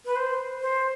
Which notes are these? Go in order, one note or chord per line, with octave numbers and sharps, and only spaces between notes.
B4
C5
C5